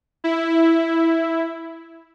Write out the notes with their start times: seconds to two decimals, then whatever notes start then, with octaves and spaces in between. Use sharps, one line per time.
0.24 E4